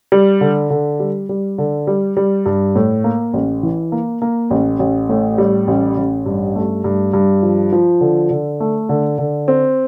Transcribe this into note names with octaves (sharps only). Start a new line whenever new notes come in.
G3
D3
D3
G3
G3
D3
G3
G3
G2
A2
A#3
A1
E3
A#3
A#3
A1
A1
A2
G3
A1
A1
G2
A3
G2
G2
F3
F3
D3
D3
A3
D3
D3
C4